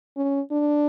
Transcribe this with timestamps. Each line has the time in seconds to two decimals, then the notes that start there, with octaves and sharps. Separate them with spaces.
0.17 C#4
0.51 D4